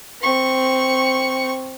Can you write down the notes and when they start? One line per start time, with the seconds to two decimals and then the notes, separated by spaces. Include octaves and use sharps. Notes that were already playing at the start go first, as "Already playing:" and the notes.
0.22 C4 C#6